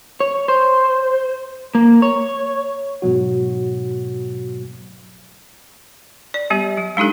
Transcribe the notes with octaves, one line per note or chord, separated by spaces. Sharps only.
C#5
C5
A#3
C#5
G#2 B2 F#3 F#4
D5
G3 B3 G4
F#3
G#3 D4 D#4 G4 A4